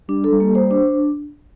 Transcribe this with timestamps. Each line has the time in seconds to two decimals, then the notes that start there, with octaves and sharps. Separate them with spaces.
0.08 G3 D4
0.24 A4
0.32 G3
0.40 A#3
0.55 C5
0.71 D4